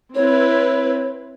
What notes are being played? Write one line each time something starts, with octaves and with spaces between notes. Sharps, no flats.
C4 E4 B4 C#5